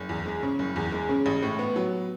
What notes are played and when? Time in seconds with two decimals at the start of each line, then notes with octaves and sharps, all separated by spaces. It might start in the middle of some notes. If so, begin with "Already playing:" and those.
Already playing: F#1
0.09 E2
0.26 G#3
0.43 C#3
0.59 F#1
0.76 E2
0.92 G#3
1.09 C#3
1.26 A1
1.42 A2
1.59 B3
1.76 F#3